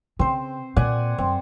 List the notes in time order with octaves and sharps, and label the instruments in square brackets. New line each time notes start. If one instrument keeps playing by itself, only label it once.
[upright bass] C#3 [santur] C4 C5
[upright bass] A#2 [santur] D5 F#5 G#5
[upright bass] F#2 [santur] C4